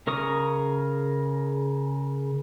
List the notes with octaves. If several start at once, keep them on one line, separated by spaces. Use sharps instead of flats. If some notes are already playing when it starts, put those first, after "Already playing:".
C#3 A#4 C#6 D#6